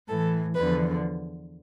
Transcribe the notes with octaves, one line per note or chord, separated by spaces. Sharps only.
A2 E3 A4
E2 D3 F3 B4